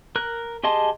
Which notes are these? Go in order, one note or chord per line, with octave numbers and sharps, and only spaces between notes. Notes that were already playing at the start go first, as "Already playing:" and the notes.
A#4 F#6
G4 G#4 D#5 A5 C6